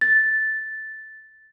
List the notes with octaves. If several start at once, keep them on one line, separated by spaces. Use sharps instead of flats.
A6